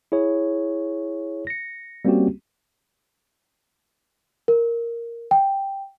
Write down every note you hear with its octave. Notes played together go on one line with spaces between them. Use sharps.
E4 G#4 C#5
A#6 C#7
G3 A#3 C4 C#4 F#4 G4
A#4
G5